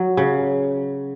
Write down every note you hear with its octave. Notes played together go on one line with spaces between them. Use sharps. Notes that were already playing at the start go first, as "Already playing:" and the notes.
Already playing: F#3
C#3